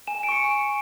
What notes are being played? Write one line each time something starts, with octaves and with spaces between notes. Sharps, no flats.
G#5 E7
D7
C#6 C#7